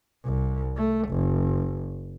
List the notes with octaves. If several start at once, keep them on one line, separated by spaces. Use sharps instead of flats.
C2
A3
F#1